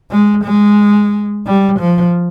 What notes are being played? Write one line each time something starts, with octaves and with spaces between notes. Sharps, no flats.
G#3
G#3
G3
F3